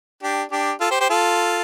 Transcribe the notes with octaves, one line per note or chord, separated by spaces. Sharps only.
D4 G4
D4 G4
F4 A4
G4 C5
G4 C5
F4 A4